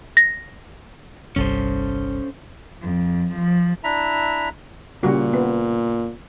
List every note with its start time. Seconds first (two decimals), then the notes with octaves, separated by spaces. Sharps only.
0.17 A#6
1.36 G1 C2 G2 C#4 A4 C5
2.82 F2
3.32 F3
3.84 D4 E4 E5 A#5
5.03 A#2 C#3 G3 F#4
5.33 B3